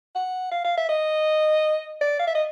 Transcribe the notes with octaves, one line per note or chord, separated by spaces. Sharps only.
F#5
F5
F5
E5
D#5
D5
F5
E5
D#5